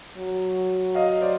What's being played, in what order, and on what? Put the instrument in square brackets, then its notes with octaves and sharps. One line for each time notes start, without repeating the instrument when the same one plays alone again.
[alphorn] F#3
[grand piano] D#5 F5
C5 D5